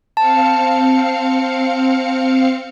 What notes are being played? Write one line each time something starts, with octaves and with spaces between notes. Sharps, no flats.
C4 F5 A5 C#7